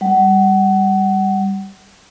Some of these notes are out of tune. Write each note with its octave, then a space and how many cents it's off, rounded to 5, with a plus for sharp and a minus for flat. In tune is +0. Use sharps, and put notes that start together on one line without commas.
G3 +10 F#5 +25